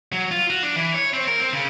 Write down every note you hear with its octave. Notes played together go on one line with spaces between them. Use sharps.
F#3
F4
F#4
D4
E3
C#5
C4
A#4
C4
C#3